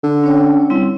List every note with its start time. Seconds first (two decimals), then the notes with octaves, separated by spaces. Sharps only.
0.03 D3
0.24 C#4 C#5 G5
0.70 G3 C4 E4